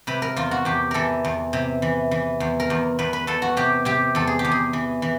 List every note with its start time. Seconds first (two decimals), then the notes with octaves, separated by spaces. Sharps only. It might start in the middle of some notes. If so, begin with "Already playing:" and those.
0.07 C3 B4
0.22 A#4
0.36 E2 F4
0.51 F#4
0.65 E2 G4
0.91 E3 A4 A#4
1.25 E2
1.53 C3
1.82 E3
2.11 E3
2.40 E2
2.60 A#4
2.70 E2
2.99 E2 B4
3.13 B4
3.27 E2 A4
3.42 F#4
3.57 C3 G4
3.85 C3 G4
4.15 E2 A4
4.27 G#4
4.39 G4
4.44 E2
4.52 G#4
4.73 E3
5.02 E3